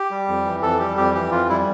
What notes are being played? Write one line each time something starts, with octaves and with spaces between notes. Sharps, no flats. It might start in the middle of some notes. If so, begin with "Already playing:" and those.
Already playing: G4
G3
F2
E3
F2 A4
G3 G4
F2 G4
E3 G4
F2 F4
G3 E4